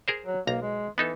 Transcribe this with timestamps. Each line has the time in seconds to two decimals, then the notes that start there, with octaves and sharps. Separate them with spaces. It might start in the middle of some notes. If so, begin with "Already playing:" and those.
0.08 G#4 A#4 C5
0.26 F#3
0.47 B1 A#3 A#5
0.62 G#3
0.98 E3 B3 D#4 A4